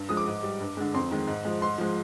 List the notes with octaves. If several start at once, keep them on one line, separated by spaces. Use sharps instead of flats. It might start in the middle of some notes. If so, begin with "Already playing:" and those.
Already playing: G2
F3 G#3 D#6
D6
G#2
G3
G2
D3 G#3
F2 C6
D#3 G#3
G#2
F3 G#3
G#2 C6
F3 G#3